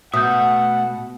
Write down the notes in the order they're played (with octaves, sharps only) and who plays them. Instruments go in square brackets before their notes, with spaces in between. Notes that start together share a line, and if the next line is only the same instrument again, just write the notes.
[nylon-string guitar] B2 [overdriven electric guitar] A3 E5 [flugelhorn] F#5 [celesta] D#6 G6